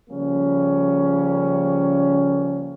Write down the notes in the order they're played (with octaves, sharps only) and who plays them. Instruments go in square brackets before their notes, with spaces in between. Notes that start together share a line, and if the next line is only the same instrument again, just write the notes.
[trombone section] C#3 F3 G3 A#3 C#4